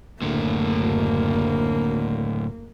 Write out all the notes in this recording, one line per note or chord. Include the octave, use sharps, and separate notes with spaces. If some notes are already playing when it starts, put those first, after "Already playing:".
F#1 D2 A2 D3 A#3